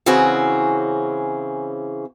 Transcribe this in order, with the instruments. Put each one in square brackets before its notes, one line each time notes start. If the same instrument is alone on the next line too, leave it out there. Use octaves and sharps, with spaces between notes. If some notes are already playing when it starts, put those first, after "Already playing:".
[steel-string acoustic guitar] C#3 E3 C4 C#4 F#4 G#4